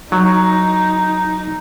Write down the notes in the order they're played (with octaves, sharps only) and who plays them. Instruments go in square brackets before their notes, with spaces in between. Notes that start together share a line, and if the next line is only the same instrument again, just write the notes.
[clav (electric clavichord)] F#3 [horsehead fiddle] D#4